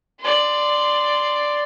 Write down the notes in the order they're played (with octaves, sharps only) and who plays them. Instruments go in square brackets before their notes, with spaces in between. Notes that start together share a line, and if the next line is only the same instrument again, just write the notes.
[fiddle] D5 C6